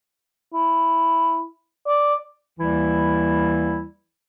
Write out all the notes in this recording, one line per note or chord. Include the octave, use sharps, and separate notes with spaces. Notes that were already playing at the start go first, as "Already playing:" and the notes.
E4
D5
D#2 E3 G3 E4